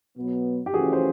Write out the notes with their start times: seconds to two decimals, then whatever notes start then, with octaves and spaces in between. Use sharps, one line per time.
0.16 B2 F#3 B3
0.66 G4
0.74 E3 A3 C#4 F4 F#4 G#4
0.93 C5